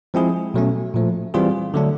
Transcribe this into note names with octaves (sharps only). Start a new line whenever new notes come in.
F3 G#3 C4 E4 G#4
B2 F#3 A3 C#4
A#2 F3 A3
E3 G3 C4 F4 G#4
D3 F#3 A3 D4